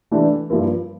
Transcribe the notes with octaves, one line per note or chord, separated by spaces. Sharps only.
E3 A3 D4
G2 F3 A#3 E4 A#4